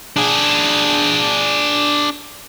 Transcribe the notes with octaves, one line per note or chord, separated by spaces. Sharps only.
D4 G#4